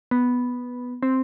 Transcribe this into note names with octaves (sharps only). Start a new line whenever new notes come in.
B3
C4